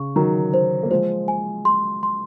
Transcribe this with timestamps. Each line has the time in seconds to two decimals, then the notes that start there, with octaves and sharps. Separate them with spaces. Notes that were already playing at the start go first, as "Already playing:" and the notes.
Already playing: C#3 C#6
0.16 D#3 F#3 A#5
0.54 C5
0.83 A#3
0.91 F3 G#3 C5
1.28 G#5
1.65 C6
2.03 C6